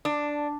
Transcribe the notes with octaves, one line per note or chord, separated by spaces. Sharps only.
D4